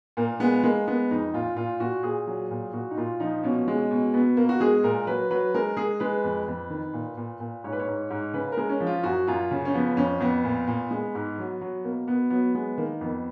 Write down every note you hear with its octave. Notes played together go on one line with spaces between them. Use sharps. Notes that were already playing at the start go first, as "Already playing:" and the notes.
A#2 A#3
G#3 B3
G#3 A#3
G#3 B3
F2 D#4
A#2 F4
A#2 F4
A#2 F#4
A#2 G#4
F#3
A#2
A#2 F#4
D#4
A#2 F4
F3 D#4
B2 C#4
G#3
B2
B2 B3
B2 A#3
F#4
G#3 G#4
A#2 A#4
F#3 B4
F#3 B4
G#3 A#4
G#3 G#4
G#3 B4
F2
F2
D#3
A#2
A#2
A#2
G#2 C#5
B4
C#5
G#2
G#2
C#3 B4
A#4
G#3
C#4
F3
F4
F#2 F#4
F#2 F4
C#3
C#4
F3 B3
F2 C#4
F2 B3
A#2
A#2
G#3
G#2
F#3
F#3
B2 A#3
B2 B3
F#3 B3
G#3 B3
D#3 A#3
F2 B3